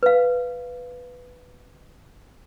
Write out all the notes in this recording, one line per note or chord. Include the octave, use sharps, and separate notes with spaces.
B4 F5